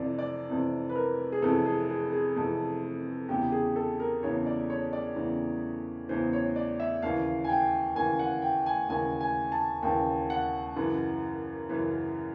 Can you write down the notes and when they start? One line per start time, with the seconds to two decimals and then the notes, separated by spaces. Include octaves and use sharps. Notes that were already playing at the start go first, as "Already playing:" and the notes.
Already playing: F2 C3 E3 D5
0.19 D5
0.49 F2 C3 E3
0.89 B4
0.95 A#4
1.32 G#4
1.42 F2 C3 E3 A4
1.66 G#4
1.89 G#4
2.13 G#4
2.36 F2 C3 E3
3.29 E2 C#3 E3 G4
3.52 G#4
3.76 A4
4.00 A#4
4.23 E2 C#3 E3 C#5
4.46 D5
4.70 C#5
4.93 D5
5.16 E2 C#3 E3
6.09 E2 C#3 E3 C5
6.33 C#5
6.56 D5
6.80 E5
7.02 D#2 C#3 E3 F5
7.44 G#5
7.49 G5
7.95 D#2 C#3 E3 G#5
8.19 F#5
8.42 G5
8.66 G#5
8.89 D#2 C#3 E3 G#5
9.21 G#5
9.52 A5
9.82 D#2 C#3 E3 G5
10.30 F#5
10.76 F#2 C#3 E3
11.69 F#2 C#3 E3